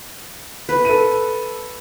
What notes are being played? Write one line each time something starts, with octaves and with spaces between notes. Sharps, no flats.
B4
A4 D#7